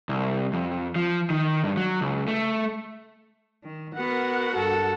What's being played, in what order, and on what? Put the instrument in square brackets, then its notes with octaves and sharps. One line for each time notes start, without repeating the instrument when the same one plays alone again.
[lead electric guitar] C2
F2
F3
D#3
G2
F#3
C#2
A3
[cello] D#3
[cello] B3 [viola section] F#4 A#4 F#5
[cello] G2 A4